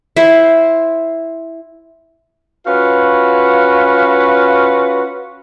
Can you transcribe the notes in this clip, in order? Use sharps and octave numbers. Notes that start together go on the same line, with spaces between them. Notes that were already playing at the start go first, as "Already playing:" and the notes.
E4 C5
C#4 F4 F#4 B4